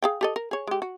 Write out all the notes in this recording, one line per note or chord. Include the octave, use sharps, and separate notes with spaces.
G#4 F5 G5
G4 A4 D#5
A#4
G#4 C#5
G#3 G4
F#4